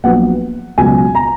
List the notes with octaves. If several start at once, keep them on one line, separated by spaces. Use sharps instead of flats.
A#1 A#2 F#3 B3 F#5
C#2 B2 F#3 G#5
A#5